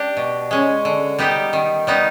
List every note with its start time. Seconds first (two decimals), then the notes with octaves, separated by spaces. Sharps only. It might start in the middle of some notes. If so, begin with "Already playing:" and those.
Already playing: D4 G4
0.17 B2
0.51 G#3 C#4
0.85 D3
1.19 G3 B3 D#4 G4
1.53 D#3
1.87 G3 B3 D#4